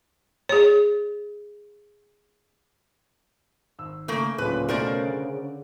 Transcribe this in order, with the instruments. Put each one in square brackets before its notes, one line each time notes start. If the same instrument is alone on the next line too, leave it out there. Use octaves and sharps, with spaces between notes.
[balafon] G#4 C#5
[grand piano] G#1 E6
[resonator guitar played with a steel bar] C#3 A#3 [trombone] A3
[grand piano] D1 A#2 F#6 [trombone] C#3 [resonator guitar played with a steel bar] B4
[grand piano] B2 A3 C#4 [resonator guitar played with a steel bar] A#4 C5 D5
[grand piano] D3